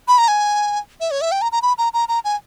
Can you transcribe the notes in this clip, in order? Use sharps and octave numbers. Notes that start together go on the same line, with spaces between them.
B5
A#5
G#5
E5
C#5
E5
G5
A#5
A#5
B5
A#5
A#5
A#5
G#5